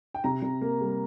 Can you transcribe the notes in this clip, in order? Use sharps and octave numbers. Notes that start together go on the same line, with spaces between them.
G5
C3 A#5
C3
A#3
G3